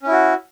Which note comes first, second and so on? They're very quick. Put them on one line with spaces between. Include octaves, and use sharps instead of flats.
C#4 E4 F#4